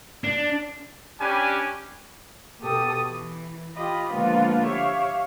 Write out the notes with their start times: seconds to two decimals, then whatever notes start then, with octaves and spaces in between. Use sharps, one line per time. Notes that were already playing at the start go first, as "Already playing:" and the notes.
0.24 D4
1.20 C#4 D4 G4 G#5 B5
2.60 B2 G4 A4 D#6
3.07 E3
3.76 F4 G4 D#5 B5
4.13 D3 F3 G#3 A#3 B3 F4
4.65 G4 C#5 E5 F5